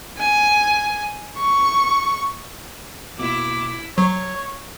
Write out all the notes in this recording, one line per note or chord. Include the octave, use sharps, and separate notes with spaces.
G#5
C#6
B2 A#3 E4 D6
F#3 C#5